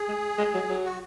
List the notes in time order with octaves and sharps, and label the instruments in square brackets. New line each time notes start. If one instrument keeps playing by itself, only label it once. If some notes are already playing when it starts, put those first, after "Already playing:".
Already playing: [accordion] G#4
[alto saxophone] G#3
G#3
F#3
F#3
[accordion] F#4